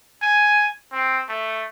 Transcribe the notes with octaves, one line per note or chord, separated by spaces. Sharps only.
G#5
C4
A3